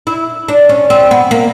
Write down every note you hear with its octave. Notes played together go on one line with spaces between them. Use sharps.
E4
D4
C#4
C4
B3
A#3